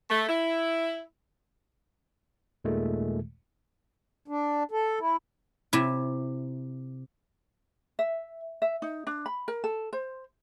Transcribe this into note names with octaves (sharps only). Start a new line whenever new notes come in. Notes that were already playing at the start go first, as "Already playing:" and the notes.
A3
E4
D#2 A#2 D#3 G#3 A3
D4
A4
E4
C3 E4
E5
E5
D#4
D4
B5
A#4
A4
C5